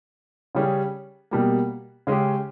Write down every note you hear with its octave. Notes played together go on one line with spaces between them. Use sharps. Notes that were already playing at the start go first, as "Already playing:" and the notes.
C#3 G3 C#4 G#4
B2 G3 A#3
C#3 G#3 C#4 G4